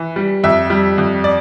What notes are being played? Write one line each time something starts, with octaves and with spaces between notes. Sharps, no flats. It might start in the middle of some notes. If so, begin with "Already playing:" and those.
Already playing: E3
G3
F2 E5
G3
F2
D5